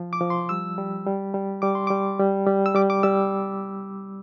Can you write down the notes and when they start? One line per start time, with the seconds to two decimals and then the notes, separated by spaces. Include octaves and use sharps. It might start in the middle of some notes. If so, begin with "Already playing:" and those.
Already playing: F3
0.13 D6
0.21 F3
0.30 C6
0.49 G3 E6
0.78 G3
1.06 G3
1.34 G3
1.62 G3 D6
1.75 C6
1.87 G3 D6
2.19 G3
2.47 G3
2.66 E6
2.75 G3 D6
2.90 D6
3.03 G3 E6